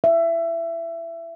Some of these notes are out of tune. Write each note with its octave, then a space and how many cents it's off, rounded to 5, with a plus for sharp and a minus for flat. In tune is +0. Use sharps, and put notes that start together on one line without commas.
E5 +20